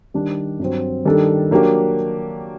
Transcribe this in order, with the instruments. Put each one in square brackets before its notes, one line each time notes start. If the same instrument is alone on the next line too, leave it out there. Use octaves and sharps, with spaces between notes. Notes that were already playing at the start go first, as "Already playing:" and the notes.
[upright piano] D#3 G3 D4
G2 F#3 C4
D#3 G3 D4 A4
F#3 A#3 D4 G4